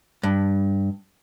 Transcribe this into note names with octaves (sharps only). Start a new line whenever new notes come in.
G2